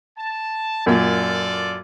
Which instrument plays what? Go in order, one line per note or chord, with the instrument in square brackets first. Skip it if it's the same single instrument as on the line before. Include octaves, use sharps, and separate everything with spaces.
[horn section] A5
[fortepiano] F#2 A#2 [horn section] F4 A4 D5